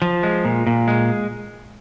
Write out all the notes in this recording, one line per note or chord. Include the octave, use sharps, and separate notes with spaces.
F3
G#3
A#2
A#2
G#3